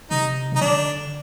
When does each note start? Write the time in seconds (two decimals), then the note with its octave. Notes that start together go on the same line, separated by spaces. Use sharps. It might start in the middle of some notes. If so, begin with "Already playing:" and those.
0.11 C3 D#4
0.52 C3 D#4
0.61 D3 D4